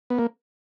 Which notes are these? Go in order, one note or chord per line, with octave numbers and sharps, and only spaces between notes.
B3
A#3